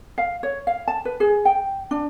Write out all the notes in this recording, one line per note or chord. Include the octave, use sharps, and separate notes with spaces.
F5
C#5
F5
A5
B4
G#4
G5
D4